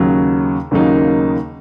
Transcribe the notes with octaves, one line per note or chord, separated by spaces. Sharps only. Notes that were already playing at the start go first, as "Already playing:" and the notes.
Already playing: D#2 C#3 F#3
D#2 C#3 F#3 A#3 D#4